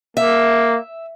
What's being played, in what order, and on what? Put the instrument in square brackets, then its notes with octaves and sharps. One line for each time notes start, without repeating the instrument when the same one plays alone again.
[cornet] A#3 [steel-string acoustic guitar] E5